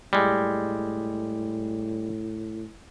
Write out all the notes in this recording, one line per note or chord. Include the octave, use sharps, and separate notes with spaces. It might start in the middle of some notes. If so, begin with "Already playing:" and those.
A2 G3 G#3